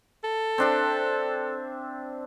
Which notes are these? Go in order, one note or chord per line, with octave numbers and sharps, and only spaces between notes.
A4
C4 D4 E5